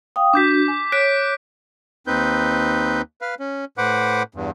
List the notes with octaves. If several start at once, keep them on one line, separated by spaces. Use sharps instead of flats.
F5 G5 D#6
D4 F#4 D6 G6 B6
G#5
C#5 F#6 B6 D7
D#2 C4 D#4 B4 G6
B4 F5
C#4
A2 B4 C5 F#5 D6
E2 G2